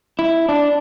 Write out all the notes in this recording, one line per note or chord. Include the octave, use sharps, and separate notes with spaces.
E4
D4